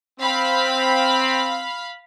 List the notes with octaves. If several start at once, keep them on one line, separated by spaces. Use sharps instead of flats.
C4 F5 B5